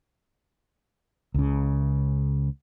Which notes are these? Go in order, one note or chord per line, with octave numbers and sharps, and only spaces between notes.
C#2 C#3